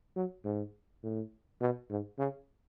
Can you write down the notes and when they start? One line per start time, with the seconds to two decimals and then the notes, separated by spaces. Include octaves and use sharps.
0.16 F#3
0.45 G#2
1.03 A2
1.61 B2
1.90 G#2
2.18 C#3